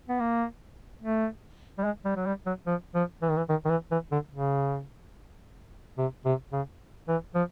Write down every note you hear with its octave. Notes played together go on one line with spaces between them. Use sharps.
B3
A#3
A3
G3
G#3
G3
F#3
G3
F#3
F3
F3
E3
D#3
E3
D#3
D#3
E3
E3
D3
C#3
C3
C3
C#3
E3
F3